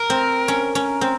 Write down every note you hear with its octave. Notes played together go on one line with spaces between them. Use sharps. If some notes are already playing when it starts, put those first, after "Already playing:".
Already playing: A#4
C4
C#4
C#4
C4